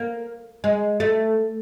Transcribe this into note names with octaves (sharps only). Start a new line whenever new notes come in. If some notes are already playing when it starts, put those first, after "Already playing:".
Already playing: A#3
G#3
A3